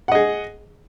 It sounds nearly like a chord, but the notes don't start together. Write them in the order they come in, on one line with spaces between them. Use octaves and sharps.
F#5 D#5 G#4